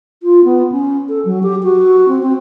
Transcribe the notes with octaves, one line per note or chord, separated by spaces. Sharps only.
F4
B3
C#4
A4
F#3
G4
F#4
C4
C4